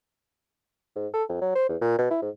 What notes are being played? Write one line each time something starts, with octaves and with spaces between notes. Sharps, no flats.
G#2
A4
F2
F#3
C5
E2
A#2
B2
E4
G#2